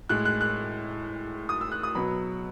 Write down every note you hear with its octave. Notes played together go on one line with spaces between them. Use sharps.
A2 G#3 F#6
F#6
F#6
D#6
E6
F#6
D#6
B2 F#3 B5